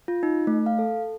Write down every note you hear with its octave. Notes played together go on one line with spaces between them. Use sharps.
F4
D#4
A3
F5
A4